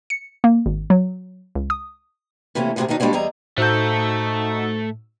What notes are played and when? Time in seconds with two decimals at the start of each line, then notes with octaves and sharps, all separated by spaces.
0.10 C#7
0.44 A#3
0.66 G#1
0.90 F#3
1.55 C#2
1.70 D#6
2.55 C3 E3 A3 A#3 C#4
2.76 D2 A2 C3 B3 G#4 A#4
2.88 D#3 F#3 D4 D#4
3.00 B2 G3 G#3 A#3 D4 F#4
3.13 E2 G3 G#4 D#5 A#5
3.58 A2 A3 D#4 F#4 A4 C5 E6 G6